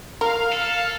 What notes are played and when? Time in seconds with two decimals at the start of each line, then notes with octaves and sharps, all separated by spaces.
0.21 A#4 F5
0.52 A4